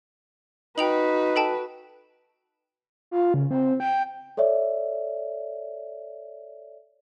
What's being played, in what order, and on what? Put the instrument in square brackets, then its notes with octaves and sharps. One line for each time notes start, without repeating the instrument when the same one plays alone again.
[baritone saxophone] D#4 [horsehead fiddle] F#4 B4 [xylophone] G5 F7 F#7
[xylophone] A4 G5 A5
[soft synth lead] F4
C#3
C4
G5
[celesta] A4 C#5 D5 E5